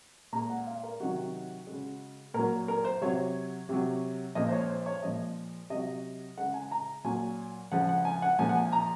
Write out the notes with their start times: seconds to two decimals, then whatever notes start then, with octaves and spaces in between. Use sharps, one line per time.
0.32 A#2 G#3 A#5
0.50 F#5
0.67 F5
0.83 A#4
1.00 C3 D#3 F#3 F#4
1.67 C#3 G#3
2.34 A#2 F#3 A#4
2.68 A#4
2.84 C5
3.01 C3 F#3 C#5
3.69 C3 F#3
4.35 A#2 F3 G#3 D#5
4.49 C5
4.53 C#5
4.70 C5
4.86 C#5
5.02 A#2 F3 G#3 D#5
5.70 C3 F#3 D#5
6.37 C#3 G#3 F#5
6.54 G#5
6.71 A#5
7.04 A#2 F#3 G#5
7.71 C#3 F3 G#3 F#5
7.89 F#5
8.05 G#5
8.22 F#5
8.39 A#2 F3 G#3 G#5
8.49 F#5
8.55 G#5
8.72 A#5